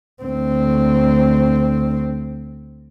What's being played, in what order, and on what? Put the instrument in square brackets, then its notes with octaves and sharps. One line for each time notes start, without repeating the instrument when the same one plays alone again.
[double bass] D2 C4